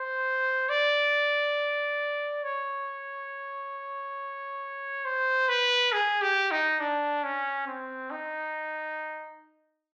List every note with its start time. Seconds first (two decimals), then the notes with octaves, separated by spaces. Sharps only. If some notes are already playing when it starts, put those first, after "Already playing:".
Already playing: C5
0.69 D5
2.44 C#5
5.05 C5
5.49 B4
5.93 G#4
6.21 G4
6.51 D#4
6.80 D4
7.24 C#4
7.67 C4
8.10 D#4